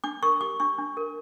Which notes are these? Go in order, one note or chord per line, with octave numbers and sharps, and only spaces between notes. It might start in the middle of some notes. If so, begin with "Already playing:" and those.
D4 D6
A#4 C#6
G4 D6
D4 C#6
D4
A#4